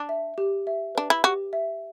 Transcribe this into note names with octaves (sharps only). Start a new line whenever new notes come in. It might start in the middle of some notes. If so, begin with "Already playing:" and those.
Already playing: D4
E5
G4
E5
D4 B4
E4
F#4 G4
E5